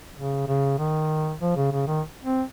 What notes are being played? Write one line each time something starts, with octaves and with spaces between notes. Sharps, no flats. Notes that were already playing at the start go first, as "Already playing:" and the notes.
C#3
C#3
D#3
F3
C#3
C#3
D#3
C4